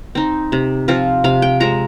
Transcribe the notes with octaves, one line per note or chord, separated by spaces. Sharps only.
C4 D#4
C3
F3 C4 F4
C3 F5
G5
F3 G#3 C4 A#5